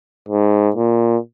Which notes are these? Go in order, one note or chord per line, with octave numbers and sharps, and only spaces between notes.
G#2
A#2